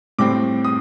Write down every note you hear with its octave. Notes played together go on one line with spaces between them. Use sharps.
A2 G3 C4 D6
D#6